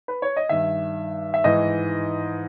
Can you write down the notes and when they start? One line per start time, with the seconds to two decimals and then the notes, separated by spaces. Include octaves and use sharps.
0.08 B4
0.22 C#5
0.37 D#5
0.49 G2 D#3 E5
1.34 E5
1.44 G#2 E3 D#5